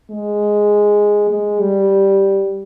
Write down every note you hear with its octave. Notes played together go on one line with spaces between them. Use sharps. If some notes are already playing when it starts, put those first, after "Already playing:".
G#3
G#3
G3